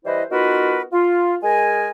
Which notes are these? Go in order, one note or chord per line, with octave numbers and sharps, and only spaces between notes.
E3 G3 E4 B4 C5 D#5
B3 D#4 F4 F#4 A#4 B4
F4
G#3 A#4 G#5